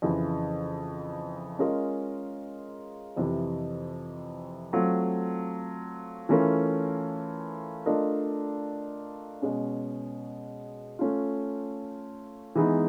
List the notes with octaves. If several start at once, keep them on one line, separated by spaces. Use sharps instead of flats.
F2 C#3 E3
G#3 C#4 F4 A#4 D#5
F2 C3 E3
F#3 A3 C4 F4
E3 A3 C#4 F4 A#4
A3 D4 F4 A#4 D#5
B2 G#3 C#4
A3 C#4 F4
E3 G#3 B3 D#4 G#4